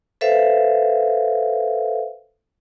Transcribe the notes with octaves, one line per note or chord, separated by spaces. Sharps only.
A4 B4 C5 E5 F5